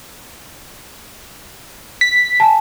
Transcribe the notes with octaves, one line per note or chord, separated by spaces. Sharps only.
B6
G#5 A5